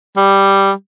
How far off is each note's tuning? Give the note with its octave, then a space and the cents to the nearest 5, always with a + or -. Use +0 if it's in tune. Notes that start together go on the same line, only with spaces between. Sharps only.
G3 +0